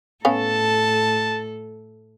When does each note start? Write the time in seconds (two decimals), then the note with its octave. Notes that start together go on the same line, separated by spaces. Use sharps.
0.25 A2 B3 C#4 A4 F5 A5